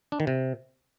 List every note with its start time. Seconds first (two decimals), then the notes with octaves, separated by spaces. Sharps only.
0.12 D4
0.20 D#3
0.27 C3